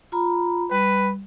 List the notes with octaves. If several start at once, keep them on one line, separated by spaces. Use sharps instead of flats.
F4 A#5 B5
G3 B4